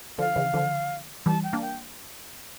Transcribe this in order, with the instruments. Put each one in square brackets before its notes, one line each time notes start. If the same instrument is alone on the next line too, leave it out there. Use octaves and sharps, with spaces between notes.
[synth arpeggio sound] D3 F3 [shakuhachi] F5
[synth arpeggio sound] C#3 E3
D3 F3
[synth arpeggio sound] E3 G3 [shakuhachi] A5
[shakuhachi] G5
[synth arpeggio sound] A#3 D4
[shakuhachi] G5